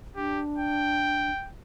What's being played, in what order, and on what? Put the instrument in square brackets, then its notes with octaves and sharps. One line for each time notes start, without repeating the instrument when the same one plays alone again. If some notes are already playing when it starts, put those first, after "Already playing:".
[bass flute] D4 [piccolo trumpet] G4
[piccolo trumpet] G5